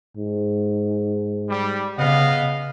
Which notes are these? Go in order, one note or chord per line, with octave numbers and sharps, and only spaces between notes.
G#2
G3
C#3 B3 D#5 F5